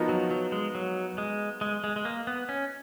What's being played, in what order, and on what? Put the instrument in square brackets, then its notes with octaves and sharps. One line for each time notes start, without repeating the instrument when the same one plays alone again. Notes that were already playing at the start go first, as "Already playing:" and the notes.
Already playing: [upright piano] F3 B3 D#4 F#4 A#4
[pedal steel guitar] F#3
F#3
G#3
F#3
G#3
G#3
G#3
G#3
A#3
B3
C#4